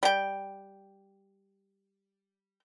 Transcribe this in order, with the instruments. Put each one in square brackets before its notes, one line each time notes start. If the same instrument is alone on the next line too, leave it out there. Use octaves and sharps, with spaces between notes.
[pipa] G3 G5